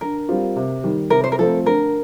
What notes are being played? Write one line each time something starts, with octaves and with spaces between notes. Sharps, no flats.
D3 A#4
G3 C4 F4
C3
D#3 G3
C3 A#4
C5
A#4
F3 A3 C4 A4
D3 A#4